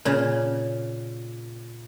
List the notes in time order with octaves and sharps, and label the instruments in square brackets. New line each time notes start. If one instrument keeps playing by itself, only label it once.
[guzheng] A#2 C#3